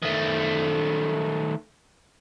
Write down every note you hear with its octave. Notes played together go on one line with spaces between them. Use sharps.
D#3 A3